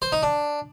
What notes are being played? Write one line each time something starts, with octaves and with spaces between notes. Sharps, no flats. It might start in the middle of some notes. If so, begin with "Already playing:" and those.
C5
D#4
D4